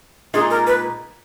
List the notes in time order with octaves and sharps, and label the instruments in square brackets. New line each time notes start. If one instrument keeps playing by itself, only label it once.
[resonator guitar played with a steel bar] A#2 G#3 D#4 [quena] G#4
[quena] A#4
B4